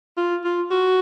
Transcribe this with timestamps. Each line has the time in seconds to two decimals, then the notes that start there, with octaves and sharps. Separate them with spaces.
0.17 F4
0.44 F4
0.71 F#4